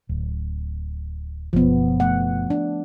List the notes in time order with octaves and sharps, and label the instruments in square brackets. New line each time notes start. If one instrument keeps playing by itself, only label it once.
[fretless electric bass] D1
[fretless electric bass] F#1 B2 [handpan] F3 B3
[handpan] A3 F#5
D4